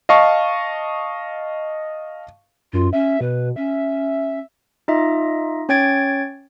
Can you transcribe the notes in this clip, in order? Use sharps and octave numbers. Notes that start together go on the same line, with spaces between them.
D#5 F5 A5 C#6
F#2 F4
C#4 E5
B2 B4
C#4 E5
D#4 F4 D#5 E5
C#4 C#5 G5 G#6 A6 D7